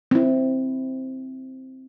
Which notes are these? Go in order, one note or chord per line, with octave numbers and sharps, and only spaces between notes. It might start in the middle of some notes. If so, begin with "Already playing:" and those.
C4 E4